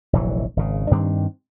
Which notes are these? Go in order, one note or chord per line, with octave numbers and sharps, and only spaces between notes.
F1 A#1 E3 F#3
G#1 C#3
G2 D#3 C4 D4